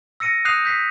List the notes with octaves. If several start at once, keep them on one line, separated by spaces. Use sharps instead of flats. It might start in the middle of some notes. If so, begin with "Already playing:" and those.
E6 A#6 C#7 D#7
D#6 F#6 G6 C7 D#7 F7
G6 B6 C7